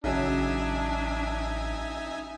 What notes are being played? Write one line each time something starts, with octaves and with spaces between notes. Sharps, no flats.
A1 C#3 F#3 D4 D#4 E5 G#5